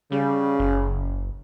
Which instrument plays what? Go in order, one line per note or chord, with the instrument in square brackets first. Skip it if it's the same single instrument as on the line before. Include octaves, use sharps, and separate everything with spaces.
[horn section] C#3 [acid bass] G3
[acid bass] F#1